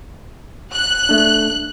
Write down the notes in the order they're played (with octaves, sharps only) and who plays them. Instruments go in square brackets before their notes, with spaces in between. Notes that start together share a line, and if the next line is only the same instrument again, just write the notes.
[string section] F#6
[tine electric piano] A3 D4